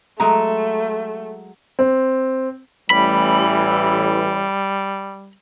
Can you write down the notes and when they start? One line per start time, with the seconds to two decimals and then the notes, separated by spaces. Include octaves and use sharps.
0.20 F#3 G#3 A3 A#5
1.79 C4
2.90 A1 E3 G3 B5